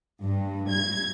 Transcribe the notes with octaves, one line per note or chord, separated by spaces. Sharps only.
G2
G#6